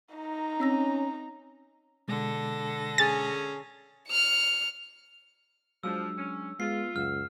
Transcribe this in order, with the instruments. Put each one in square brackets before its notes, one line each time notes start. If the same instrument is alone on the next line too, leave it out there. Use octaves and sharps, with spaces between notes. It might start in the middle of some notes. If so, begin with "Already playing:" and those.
[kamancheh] D#4 A#5
[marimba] C4 E6 A#6 [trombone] C#4
[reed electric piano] B2 G#3 [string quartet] D3 A4 A#6
[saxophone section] C#4 G#4 [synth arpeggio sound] A6
[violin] F6 C#7
[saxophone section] F3 [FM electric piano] F#3 G#3 D4 [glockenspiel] E6
[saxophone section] C#4
[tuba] G#3 [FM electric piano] B3 [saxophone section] F4 [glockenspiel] C7
[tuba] C#2 [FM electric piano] F#2 F#5 E6 [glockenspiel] F6